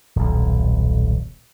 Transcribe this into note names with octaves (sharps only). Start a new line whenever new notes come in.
D#1 B1